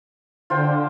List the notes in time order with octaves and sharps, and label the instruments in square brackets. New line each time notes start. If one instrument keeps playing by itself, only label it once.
[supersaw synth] D3 [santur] F4 C5 G5